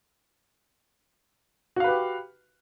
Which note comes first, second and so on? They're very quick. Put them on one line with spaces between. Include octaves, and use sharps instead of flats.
F#4 F5 B4 G4